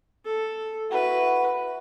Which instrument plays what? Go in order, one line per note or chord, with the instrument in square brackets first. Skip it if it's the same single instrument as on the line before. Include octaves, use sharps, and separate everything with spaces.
[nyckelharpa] A4
[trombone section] E4 F#4 [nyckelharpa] B4